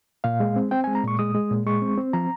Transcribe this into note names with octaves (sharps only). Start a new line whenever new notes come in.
A#2 F5
G#3
C4
C4 G5
G#3 G#5
A#5
A#2 C#6
G#3 D#6
G#3
A#2
G#3 C#6
C4
C4
F3 A#5